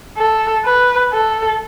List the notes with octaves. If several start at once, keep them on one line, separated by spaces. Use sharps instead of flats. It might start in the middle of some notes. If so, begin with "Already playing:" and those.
A4
B4
A4